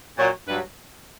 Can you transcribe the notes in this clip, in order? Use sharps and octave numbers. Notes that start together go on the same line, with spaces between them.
A#2 F#3 C#5
G2 F#3 B4